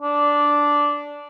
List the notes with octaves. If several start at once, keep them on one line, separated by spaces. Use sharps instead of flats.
D4